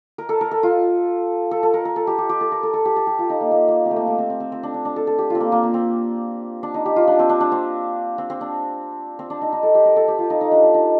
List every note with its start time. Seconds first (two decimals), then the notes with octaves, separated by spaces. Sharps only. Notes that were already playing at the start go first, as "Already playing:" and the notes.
0.18 A#4
0.29 A4
0.41 A#4
0.51 A4
0.63 F4
1.51 A4
1.63 A4
1.74 A#4
1.85 A#4
1.96 A4
2.07 G4
2.18 G4
2.29 G4
2.41 A4
2.52 A#4
2.63 A4
2.74 A4
2.85 G4
2.96 A4
3.07 G4
3.19 F4
3.30 D#4
3.41 A#3
3.52 A#3
3.68 A#3
3.86 C4
3.91 A3
3.96 A#3
4.07 A3
4.18 C4
4.30 C4
4.40 C4
4.52 C4
4.63 D4
4.74 D4
4.85 D4
4.96 A4
5.07 A4
5.19 G4
5.30 C4 F4
5.40 A#3
5.52 A#3
5.63 A#3
5.74 C4
6.63 D4
6.74 D#4
6.86 G4
6.96 F4
7.07 D4
7.19 C4
7.29 D4
7.41 D4
7.52 C4
8.18 C4
8.30 C4
8.41 D4
9.19 C4
9.30 D4
9.41 D#4
9.53 D#4
9.63 A4
9.75 G4
9.85 A#4
9.96 A4
10.08 G4
10.19 F4
10.30 D#4
10.41 D#4
10.52 D4
10.63 D4
10.74 D#4